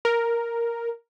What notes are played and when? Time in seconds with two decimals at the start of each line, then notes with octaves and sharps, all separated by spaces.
0.05 A#4